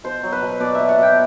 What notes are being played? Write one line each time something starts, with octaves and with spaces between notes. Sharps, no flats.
B2 C5
F#3
B4
B2
B2 D5
E5
B2
F#5
B2 G5